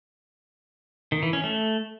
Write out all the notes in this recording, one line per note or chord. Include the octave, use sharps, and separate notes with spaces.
D#3
E3
C#4
A3